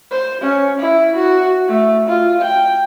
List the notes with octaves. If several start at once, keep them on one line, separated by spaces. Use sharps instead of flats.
C5
C#4
E4
F#4
A3
F4
G5